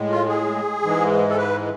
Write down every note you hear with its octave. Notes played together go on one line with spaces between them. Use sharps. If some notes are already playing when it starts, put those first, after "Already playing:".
Already playing: A2 G#3
F4
G#4
G#2 E3 G#3
A4
B4